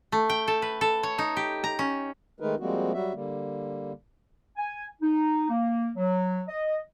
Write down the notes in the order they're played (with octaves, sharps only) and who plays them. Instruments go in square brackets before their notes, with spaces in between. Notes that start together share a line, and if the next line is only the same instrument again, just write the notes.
[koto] A3
G5
A4
B4
A4
C#5
D#4
G4
A#5
C#4
[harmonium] D#3 G#3 A3 D#4 A#4 B4
F3 G3 G#3 A#3 C4 F#4
F#3 G3 F#4 E5
D3 G3 A#3
[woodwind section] G#5
D#4
A#3
F#3
D#5